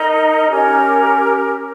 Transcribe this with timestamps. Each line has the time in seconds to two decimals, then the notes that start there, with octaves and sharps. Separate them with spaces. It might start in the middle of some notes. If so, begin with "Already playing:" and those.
Already playing: D#4 A#4 D#5 A#5
0.49 C#4 G4 A#4